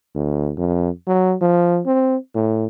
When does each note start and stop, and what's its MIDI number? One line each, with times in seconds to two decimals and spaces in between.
0.15 0.52 38
0.57 0.89 41
1.07 1.35 54
1.41 1.81 53
1.86 2.16 60
2.35 2.67 45